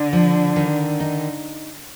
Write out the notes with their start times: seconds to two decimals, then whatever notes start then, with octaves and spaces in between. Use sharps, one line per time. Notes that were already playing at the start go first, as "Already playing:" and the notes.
Already playing: D3
0.13 F3
0.56 D#3
1.00 D#4